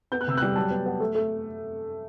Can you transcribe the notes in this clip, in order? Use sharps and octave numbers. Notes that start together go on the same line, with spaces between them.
B3 G6
F#6
C3 E6
F#6
G3
F#3 A5
B3
B3
A3
A3